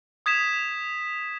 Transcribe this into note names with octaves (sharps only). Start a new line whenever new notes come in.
D#6 G#6 B6 E7